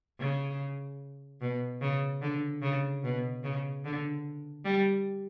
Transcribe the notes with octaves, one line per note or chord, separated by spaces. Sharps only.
C#3
B2
C#3
D3
C#3
B2
C#3
D3
G3